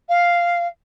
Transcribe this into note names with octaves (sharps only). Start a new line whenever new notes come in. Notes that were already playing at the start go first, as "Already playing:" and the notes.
F5